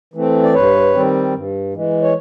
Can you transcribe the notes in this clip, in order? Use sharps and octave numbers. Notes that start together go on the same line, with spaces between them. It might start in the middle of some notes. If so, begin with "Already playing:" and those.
E3 A3 C4
D5
G2 B4 C#5
D#3 G3 C4
G2
E3 G#3
C#5